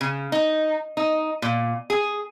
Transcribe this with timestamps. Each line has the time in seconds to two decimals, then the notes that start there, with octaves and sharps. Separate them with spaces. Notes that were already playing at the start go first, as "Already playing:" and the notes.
0.01 C#3
0.32 D#4
0.97 D#4
1.42 A#2
1.90 G#4